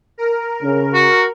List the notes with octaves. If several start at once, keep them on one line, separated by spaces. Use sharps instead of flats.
A#4
C#3 C#4
F#4